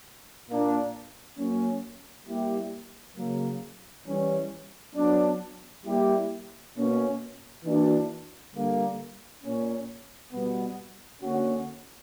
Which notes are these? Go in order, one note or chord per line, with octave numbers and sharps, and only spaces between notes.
A#2 A#3 D4
F#3 A#3 C#4
G3 A#3 E4 G4
C#3 F#3 A#3
E3 G3 C#4
F#3 B3 D4
G3 A#3 E4 G4
B2 A#3 C#4
E3 A#3 D4 F#4
D3 G3 A#3
A#2 A#3 C#4
B2 G3 B3
D3 A#3 C#4 F#4